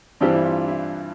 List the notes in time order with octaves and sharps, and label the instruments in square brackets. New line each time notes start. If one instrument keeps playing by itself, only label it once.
[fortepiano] G2 E3 G3 C4 G4 [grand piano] D4
[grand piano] E4
F4
E4